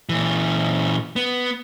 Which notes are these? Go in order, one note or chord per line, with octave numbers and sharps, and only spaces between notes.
A#2 E3
B3